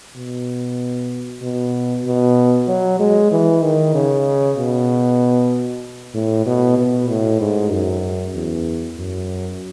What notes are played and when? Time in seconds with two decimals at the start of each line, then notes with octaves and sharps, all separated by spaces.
0.16 B2
1.42 B2
2.06 B2
2.68 F#3
3.00 G#3
3.32 E3
3.62 D#3
3.94 C#3
4.57 B2
6.14 A2
6.46 B2
6.78 B2
7.09 A2
7.41 G#2
7.71 F#2
8.35 E2
8.98 F#2